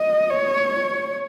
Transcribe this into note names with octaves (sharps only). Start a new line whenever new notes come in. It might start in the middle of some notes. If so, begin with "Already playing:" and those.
Already playing: D#5
C#5